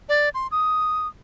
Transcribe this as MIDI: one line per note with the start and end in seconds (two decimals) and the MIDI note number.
0.09 0.29 74
0.34 0.47 84
0.51 1.07 87